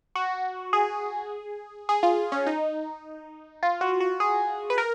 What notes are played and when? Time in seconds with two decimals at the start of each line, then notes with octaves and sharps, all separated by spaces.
0.15 F#4
0.73 G#4
1.89 G#4
2.03 F4
2.32 C#4
2.47 D#4
3.63 F4
3.81 F#4
4.01 F#4
4.20 G#4
4.70 B4
4.78 A#4